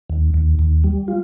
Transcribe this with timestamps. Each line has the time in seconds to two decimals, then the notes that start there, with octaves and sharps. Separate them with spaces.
0.10 D#2
0.34 D#2
0.59 D#2
0.84 G3
1.08 F4